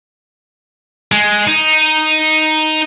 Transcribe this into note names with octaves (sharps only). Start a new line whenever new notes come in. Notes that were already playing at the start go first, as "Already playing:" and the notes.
G#3
D#4